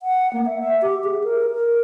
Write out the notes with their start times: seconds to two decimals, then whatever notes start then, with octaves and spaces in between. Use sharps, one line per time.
0.01 F#5
0.33 A#3
0.46 E5
0.58 E5
0.82 G4
1.04 G#4
1.24 A#4
1.51 A#4